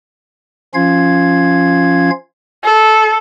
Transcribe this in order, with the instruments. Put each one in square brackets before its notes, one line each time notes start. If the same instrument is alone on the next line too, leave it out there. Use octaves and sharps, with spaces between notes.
[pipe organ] F3 C#4 F4 F5 G#6
[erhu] A4